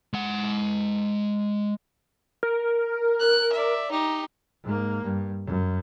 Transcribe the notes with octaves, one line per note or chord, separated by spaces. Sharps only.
G#3 F#5
A#4
F#6
D5 E5
D#4 G4
G#2 A#3
G2
F#2